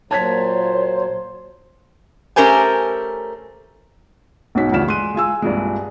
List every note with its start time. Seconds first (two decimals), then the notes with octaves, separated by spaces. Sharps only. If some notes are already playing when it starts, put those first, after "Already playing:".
0.11 A#2 F#3 C5 C#5 A5 G#6 B6
2.36 A3 C#4 G4 A#4 C5 G#5
4.55 B1 G#2 C#4 F#4 B6
4.72 D2 G2 F3 F6 B6 E7
4.88 G#3 C6 F#6 D#7
5.14 G#3 F4 G#5 E6
5.42 C2 G2 A#2 G#3